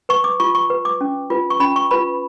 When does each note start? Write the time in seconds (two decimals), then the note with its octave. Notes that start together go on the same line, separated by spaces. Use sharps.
0.09 B4 C#6
0.24 D6
0.40 F4 C#6
0.55 C#6
0.70 B4
0.85 D6
1.01 C#4
1.30 F4 B4
1.50 C#6
1.60 C#4 B5
1.76 C#6
1.91 F4 B4 B5